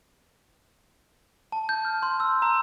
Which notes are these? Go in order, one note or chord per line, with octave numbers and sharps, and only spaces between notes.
A5
G6
F6
C6
E6
A#5